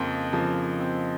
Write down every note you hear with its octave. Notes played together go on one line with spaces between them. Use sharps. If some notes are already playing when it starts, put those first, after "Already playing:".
Already playing: F2 C#3 F3 A#3 C4 D#4
F2 C#3 F3 A#3
C4